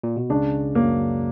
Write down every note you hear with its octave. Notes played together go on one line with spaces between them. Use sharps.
A#2
B2
C#2 C#3 D4
F#2 F#3 A#3